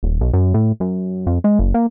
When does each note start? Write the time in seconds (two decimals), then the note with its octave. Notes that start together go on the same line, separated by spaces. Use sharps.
0.03 D#1
0.21 B1
0.33 F#2
0.54 A2
0.80 F#2
1.26 F2
1.44 G#3
1.59 F#1
1.74 A#3